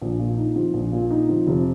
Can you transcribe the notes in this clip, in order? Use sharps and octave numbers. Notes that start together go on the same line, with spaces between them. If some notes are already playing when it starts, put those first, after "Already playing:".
A#1
A#2
D#4
F3
A#1
A#2
D#4
F3
F1